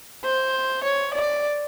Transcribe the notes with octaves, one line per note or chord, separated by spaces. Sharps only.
C5
C#5
D5